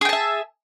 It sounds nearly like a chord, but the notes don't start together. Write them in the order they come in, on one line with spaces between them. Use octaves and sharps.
G#4 G5 A5 E5